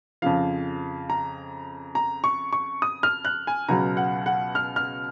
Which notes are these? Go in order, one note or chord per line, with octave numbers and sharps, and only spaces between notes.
F2 C#3 F3 F5
A#5
A#5
C#6
C#6
D#6
F6
F#6
G#5
C#2 B2 F#3 A#5
F#5
F#5
F6
F6